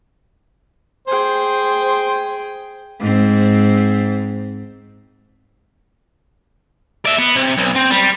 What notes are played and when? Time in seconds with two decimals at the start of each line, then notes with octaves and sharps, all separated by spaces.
1.08 G#4 C5 G5
3.00 G#2 C4
7.05 D5 E5
7.18 B3
7.36 C3
7.57 B1
7.75 C4
7.90 G3